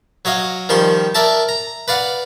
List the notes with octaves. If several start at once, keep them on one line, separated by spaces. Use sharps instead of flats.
F#3 C#5 D#5 F5
D#3 F3 G3 C6 C#6
A#4 D5 E5 A5
A#5
B4 D5 F5 F#5